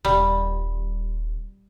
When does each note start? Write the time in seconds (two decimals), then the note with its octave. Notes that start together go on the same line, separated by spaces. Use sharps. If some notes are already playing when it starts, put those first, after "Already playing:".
0.05 D#1 G3